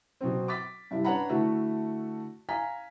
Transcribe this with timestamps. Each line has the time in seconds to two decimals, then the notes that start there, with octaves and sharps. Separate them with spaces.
0.21 B2 F#3 C4
0.48 D6 A6 B6
0.91 G2 C3 E4
1.04 D4 B4 C#5 F#5 A#5 B5
1.29 D3 A3 E4 F#4
2.49 F5 G#5 A#5 B6